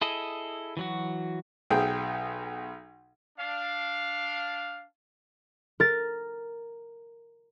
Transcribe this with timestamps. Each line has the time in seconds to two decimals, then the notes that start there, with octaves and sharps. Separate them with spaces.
0.02 E4 G#4 A4 D#5
0.77 E3 F#3 F#4
1.70 B1 G#4 G5
3.39 D4 F5
5.80 A#4 A6